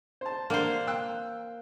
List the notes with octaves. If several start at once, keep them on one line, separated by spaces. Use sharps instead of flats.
C5 A5
A#3 D4 C5 D5 F#5
G5 E6 F#6